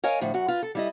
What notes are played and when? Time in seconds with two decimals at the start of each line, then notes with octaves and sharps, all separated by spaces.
0.04 A#4 C#5 D#5 F5 G#5
0.21 A2 D3 F3
0.34 F#2 F#4
0.48 F4 B4
0.63 A4
0.75 G3 E4 D#5